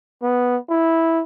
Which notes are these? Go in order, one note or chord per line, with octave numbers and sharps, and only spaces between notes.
B3
E4